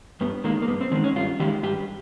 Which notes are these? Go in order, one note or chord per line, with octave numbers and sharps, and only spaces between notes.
G2 B3
D#3 G#3 A#3
A#3
G2 B3
C4
D#3 G#3 C4
C#4
G2 F4
D#3 G#3 G4
G2 G4